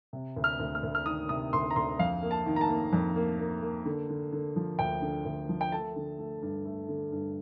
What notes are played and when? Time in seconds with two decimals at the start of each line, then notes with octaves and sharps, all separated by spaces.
0.13 C3
0.36 D2
0.44 F6
0.60 D2
0.75 F6
0.83 D2
0.95 F6
1.06 D#3 D#6
1.29 C3 D#6
1.53 D2 C6
1.71 A#5
1.76 D2 C6
1.99 F2 F5
2.23 A#3
2.31 A5
2.46 D#3
2.56 A#5
2.61 A5
2.69 A#3
2.93 F2
3.16 A#3
3.40 A#3
3.63 A#3
3.86 D3
4.09 D3
4.33 D3
4.56 F3
4.79 D2 G5
5.02 D3
5.25 D2
5.49 F3
5.61 G5
5.72 A3 A5
5.96 D3
6.19 A3
6.42 G2
6.65 A3
6.89 D3
7.12 G2